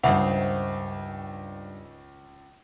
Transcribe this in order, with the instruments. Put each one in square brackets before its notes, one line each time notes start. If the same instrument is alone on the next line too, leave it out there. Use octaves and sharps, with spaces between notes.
[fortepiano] C#2 [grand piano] G2 F7 [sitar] D#3 C5 [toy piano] E5 F#5